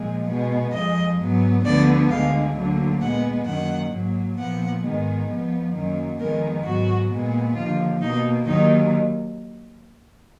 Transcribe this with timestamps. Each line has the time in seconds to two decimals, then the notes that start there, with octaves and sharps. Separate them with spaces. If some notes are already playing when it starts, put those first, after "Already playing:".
Already playing: A#2 F3 G#3
0.28 B2 G#3 B3
0.73 F2 F3 G#3 D#5
1.20 G#2 F#3 B3
1.65 D2 D3 F3 B3 D5
2.10 D2 D3 G#3 F5
2.57 D2 D3 F#3 A#3
3.02 A#2 G#3 B3 F#5
3.46 F#2 D#3 A#3 F#5
3.93 G#2 F#3 A#3
4.38 A#2 F3 B3 F#5
4.84 G#2 D#3 G#3 B3
5.29 F2 F3 B3
5.74 F#2 D#3 F#3 A#3
6.20 F2 D#3 G#3 B3 A#4
6.65 G#2 F#3 B3 F#4
7.11 A#2 G#3 B3
7.56 D#2 D3 F3 F4
8.02 B2 A#3 D#4
8.47 D#2 D#3 F#3 D#4